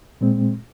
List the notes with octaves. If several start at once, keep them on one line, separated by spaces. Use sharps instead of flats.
A#2 G#3 C4